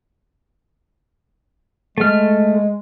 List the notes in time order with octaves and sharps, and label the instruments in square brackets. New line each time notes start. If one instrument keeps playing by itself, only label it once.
[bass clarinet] G#3 [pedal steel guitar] A3 F6